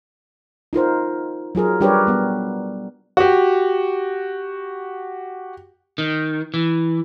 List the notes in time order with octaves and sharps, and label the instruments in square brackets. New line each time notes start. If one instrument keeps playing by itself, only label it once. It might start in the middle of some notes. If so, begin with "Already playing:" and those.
[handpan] D#4 F4 A#4 C5
F#3 F4 G#4 A#4
G3 D4 G4 A#4 B4 C#5
G3 B3
[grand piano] F#4 G4
[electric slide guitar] D#3
E3